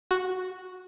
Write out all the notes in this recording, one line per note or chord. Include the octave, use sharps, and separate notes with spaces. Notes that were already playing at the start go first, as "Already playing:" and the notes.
F#4